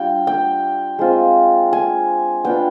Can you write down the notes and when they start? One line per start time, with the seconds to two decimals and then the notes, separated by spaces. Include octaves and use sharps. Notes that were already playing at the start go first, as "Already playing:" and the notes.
Already playing: G3 D4 F4 G5
0.27 G5
0.99 G#3 C4 F4
1.73 G#5
2.45 B3 D4 F4 G5